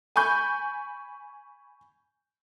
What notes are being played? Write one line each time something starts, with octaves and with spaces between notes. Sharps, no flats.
G#5 B5 C#6 G6